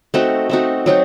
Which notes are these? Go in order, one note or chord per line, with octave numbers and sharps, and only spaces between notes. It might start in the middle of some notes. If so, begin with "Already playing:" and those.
A3 C4 D#4 F#4
A3 C4 D#4 F#4
F#3 C4 D#4 F#4